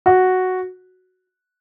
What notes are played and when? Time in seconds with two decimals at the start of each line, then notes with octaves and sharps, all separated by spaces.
0.06 F#4